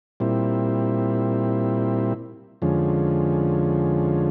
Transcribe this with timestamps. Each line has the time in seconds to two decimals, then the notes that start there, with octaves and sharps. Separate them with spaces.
0.20 A#2 G3 C4 E4
2.62 F2 D3 F3 G#3 C#4